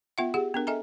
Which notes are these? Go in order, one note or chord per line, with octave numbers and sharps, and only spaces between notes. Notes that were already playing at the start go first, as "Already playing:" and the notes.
B3 F4 E5 F#5
G4 G#4 F#5
B3 D4 A#4
A4 D#5 E5 G#5 A#5